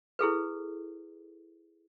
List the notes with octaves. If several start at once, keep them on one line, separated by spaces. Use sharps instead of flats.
E4 G#4 A4 B4